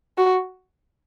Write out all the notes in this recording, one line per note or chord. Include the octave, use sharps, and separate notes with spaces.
F#4